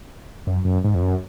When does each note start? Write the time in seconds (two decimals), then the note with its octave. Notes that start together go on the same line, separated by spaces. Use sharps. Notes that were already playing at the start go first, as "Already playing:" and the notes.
0.47 F#2
0.65 F#2
0.84 G#2
0.95 F2
1.02 F#2